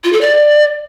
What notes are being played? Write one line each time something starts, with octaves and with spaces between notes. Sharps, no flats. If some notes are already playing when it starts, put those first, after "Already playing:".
F4
A4
D5